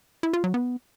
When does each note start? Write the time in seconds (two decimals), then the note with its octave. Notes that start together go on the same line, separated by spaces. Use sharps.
0.23 E4
0.33 F4
0.44 F#3
0.54 B3